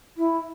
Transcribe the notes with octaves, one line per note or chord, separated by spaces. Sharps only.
E4